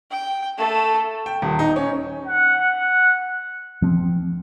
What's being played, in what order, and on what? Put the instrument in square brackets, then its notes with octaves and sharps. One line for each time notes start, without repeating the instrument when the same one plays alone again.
[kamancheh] G5
A3 A4
[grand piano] G5
D#1
D#4
C#4
[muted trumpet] F#5
[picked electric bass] F3 C4